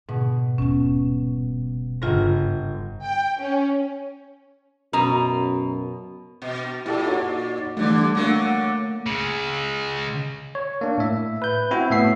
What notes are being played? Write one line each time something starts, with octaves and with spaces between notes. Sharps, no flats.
G#2 B2 D3
D#1 B3 C#4
G1 G#2 C#3 F4 A#5 A#6
G5
C#4
F#2 B2 A#5
B2
A#2 E4 G4 A4
D#4 F#4 C#5
G2 D3 E3 G3 A3
D3 F#3 A3 A#3
C#3 G#3
C#5
A#3 D4
A2 E5
B4 G6
C4 E4 F#4
A2 B3 E5 C7